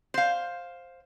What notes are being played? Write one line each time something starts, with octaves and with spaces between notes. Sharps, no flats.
C5 F5